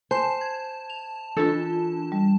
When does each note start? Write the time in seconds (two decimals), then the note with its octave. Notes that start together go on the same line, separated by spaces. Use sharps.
0.11 C5 G#5 A5
0.41 G#6
0.90 F7
1.37 E3 D4 F4 A4
2.12 G3